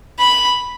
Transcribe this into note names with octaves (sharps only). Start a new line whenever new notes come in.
B5